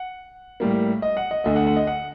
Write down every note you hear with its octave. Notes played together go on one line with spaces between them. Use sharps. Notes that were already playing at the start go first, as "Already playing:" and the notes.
Already playing: F#5
A2 G3 A#3
D#5
F#5
D#5
D2 D3 A3 D#5
F#5
F#5
D#5
F#5